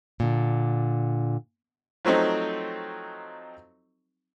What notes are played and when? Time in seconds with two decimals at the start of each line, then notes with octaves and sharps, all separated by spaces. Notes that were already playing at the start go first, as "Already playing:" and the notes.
0.20 A#2 D3
2.05 F3 F#3 A3 C4 D#4